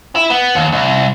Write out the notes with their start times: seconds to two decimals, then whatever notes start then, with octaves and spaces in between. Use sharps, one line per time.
0.15 E4
0.30 B3
0.55 D#2
0.72 C2